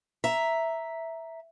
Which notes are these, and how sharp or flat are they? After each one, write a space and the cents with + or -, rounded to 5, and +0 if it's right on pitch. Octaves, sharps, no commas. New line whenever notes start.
E5 +0 A#5 +0